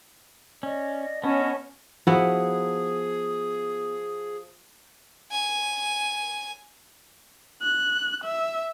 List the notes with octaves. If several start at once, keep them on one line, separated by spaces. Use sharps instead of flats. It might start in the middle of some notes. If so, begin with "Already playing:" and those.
C#4 D5 D#5
B3 C#4 D#5 G#5 A5
F3 B3 E4 F#4 G#4
G#5
F#6
E5